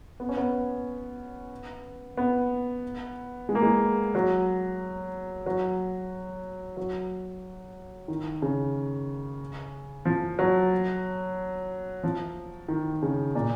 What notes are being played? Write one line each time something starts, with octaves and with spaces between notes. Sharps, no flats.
B3
C#4
B3
B3
G#3
A#3
G#3
F#3
F#3
F#3
D#3
C#3
F3
F#3
F3
D#3
C#3
A#2